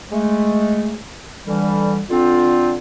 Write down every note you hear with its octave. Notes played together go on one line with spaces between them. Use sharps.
G#3 A3
D3 E3 G3
D3 C4 F4